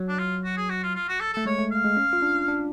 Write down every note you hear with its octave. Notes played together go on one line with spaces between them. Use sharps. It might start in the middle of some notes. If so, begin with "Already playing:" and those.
Already playing: F#3
D4
F4
F#4
G#4
F#4
F4
F4
F#4
A4
A3 A4
G#3 C#5
A3
F5
G#3
C#4
F4
D4
D4